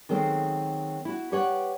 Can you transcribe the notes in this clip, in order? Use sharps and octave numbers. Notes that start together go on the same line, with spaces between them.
D#3 F#3 G#3 C4 A4
E4 F#4
G4 B4 C#5 D5 F#5